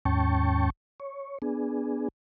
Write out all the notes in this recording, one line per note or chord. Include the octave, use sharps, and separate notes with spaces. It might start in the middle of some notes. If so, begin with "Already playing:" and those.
D#2 G#2 C#4 G5 A5 C#6
C#5
B3 D4 G#4